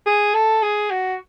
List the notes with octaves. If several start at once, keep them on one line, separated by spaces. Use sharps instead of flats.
G#4
A4
G#4
F#4